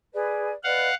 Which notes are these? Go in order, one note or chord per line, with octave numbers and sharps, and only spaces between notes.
G#4 B4 D5
B4 D5 D#5 F5 F#5